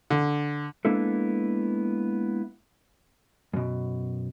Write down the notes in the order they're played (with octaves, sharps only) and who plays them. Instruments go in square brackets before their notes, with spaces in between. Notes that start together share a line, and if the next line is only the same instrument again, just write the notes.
[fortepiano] D3
[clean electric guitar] G#3 A#3 B3 D4 E4 A4
F#2 B2